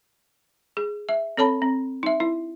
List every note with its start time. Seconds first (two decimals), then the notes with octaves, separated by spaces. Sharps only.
0.77 G#4
1.09 E5
1.37 C4 A4 C#5 A5 B5
1.62 C4
2.03 D#4 E5
2.20 E4